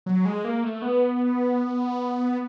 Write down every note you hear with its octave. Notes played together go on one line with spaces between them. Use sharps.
F#3
G#3
A#3
A3
B3